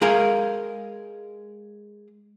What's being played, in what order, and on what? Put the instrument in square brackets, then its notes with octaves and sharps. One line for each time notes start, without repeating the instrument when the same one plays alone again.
[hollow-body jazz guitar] G#3 G#4 A#4 F5